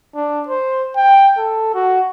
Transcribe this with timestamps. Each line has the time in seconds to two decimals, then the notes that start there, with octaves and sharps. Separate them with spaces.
0.15 D4
0.48 C5
0.96 G5
1.38 A4
1.74 F#4